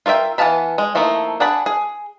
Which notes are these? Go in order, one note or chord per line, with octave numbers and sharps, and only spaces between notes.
F4 A#4 C#5 E5 G5
E3 B3 F5 A5 B5
G#3
F3 A3 A#3 D#4 E4
D4 G#4 F#5 A5 B5
G#4